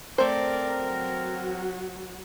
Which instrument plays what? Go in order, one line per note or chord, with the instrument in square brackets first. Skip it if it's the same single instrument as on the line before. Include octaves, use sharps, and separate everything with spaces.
[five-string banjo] A3 C5 [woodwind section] C4 A#4 [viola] D5
[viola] F#3 F#4